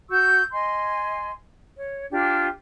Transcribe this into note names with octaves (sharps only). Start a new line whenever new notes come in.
F#4 C#6 E6 G6
D#5 G#5 C6
C#5
D4 F4 G4